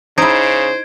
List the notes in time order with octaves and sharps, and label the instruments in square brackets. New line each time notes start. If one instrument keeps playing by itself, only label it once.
[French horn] C#3 [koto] D#4 E4 [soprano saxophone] C5 [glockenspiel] G#6 D7